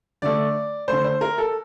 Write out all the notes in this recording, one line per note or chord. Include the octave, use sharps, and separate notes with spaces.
D3 A3 D5
D3 A3 C5
C5
A#4
A4